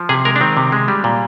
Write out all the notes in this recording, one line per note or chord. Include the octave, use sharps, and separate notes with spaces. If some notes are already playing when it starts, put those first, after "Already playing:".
Already playing: F3
C3 G#4
G#3 A#4
D4
D#3 C4
C3
G#3
G3
A#2